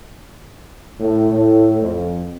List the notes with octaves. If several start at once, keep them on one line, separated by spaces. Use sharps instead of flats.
A2
A2
F2